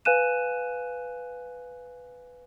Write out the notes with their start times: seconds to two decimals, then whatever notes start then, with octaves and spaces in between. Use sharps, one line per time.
0.05 B4 F5 G#5 F#6 D#7 E7